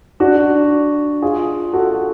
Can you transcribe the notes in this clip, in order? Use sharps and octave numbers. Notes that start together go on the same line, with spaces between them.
D4 F#4
F4 G#4
F#4 A4